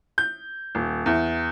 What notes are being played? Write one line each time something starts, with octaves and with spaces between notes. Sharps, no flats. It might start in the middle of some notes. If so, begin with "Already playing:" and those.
G6
D#1
E2